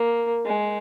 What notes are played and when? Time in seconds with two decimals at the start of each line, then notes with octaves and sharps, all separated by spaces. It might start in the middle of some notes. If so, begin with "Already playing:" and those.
Already playing: A#3
0.46 G#3